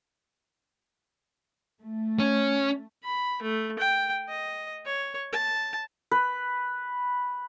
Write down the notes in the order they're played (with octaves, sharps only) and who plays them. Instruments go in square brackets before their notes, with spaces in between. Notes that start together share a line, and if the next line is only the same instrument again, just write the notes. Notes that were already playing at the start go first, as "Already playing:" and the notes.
[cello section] A3
[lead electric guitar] C#4
[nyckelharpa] B5
A3
G5
D#5
C#5
A5
[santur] B4